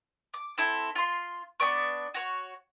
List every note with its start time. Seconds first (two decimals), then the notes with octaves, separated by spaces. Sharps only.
0.34 D6
0.58 C4 E4 A4
0.95 F4 C6
1.60 B3 D4 D5 C#6
2.14 F#4 C#5